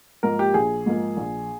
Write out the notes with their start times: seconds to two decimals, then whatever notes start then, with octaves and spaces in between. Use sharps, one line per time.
0.23 G#2 F3 A#3 A#4
0.39 G4
0.54 A#1 G#4
0.86 G#2 F3 A#3
1.17 A#1